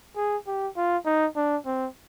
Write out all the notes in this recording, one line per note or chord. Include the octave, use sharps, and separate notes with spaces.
G#4
G4
F4
D#4
D4
C4